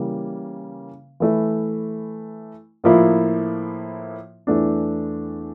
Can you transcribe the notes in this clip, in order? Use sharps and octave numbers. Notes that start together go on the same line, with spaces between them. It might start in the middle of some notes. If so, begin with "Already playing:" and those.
Already playing: C#3 E3 G3 A#3
E3 A3 E4
A2 F3 A#3 E4
E2 E3 A3 D4